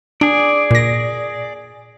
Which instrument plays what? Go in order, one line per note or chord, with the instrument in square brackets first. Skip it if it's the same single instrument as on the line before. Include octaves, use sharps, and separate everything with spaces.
[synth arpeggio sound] D4 [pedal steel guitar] G#4 D5
[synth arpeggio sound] A#2 A#6